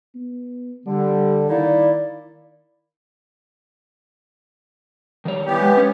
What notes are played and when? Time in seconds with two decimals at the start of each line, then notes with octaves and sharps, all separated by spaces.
0.15 B3
0.86 D3 G3
1.49 D#3 A#3 D#4 E4 D5
5.25 D#3 G3 C#5
5.46 E3 B3 G4
5.61 G#3
5.77 C#4 C#5